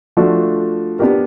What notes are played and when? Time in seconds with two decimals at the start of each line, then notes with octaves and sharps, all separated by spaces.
0.17 F3 A3 D4 F#4
0.99 B3 D4 G4 A#4